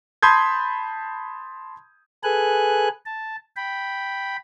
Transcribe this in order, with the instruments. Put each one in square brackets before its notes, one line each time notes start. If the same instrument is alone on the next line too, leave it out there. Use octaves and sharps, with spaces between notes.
[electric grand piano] A5 B5 C6 D#6 G6 G#6
[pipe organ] G#4 A4 B4 G#5 F#6
A5
G5 B5